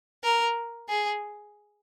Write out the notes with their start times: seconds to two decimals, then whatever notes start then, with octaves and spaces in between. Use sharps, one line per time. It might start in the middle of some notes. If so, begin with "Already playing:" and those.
0.24 A#4
0.89 G#4